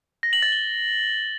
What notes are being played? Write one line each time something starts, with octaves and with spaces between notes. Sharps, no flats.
A#6
F#7
A6
G7